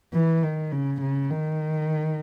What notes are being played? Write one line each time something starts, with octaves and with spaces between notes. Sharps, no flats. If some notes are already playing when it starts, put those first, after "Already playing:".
E3
D#3
C#3
C#3
D#3